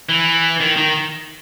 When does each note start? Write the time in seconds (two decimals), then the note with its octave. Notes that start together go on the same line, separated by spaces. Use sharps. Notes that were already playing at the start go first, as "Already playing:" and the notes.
0.09 E3
0.60 D#3
0.77 D#3